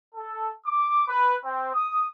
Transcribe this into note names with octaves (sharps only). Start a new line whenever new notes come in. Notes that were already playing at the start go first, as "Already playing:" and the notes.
A4
D6
B4
C4
D#6